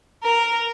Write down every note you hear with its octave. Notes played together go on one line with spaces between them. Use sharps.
A#4